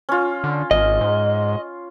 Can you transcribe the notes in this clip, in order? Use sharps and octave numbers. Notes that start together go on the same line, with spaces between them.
C#4 F4
D3
G#1 D#5
G#2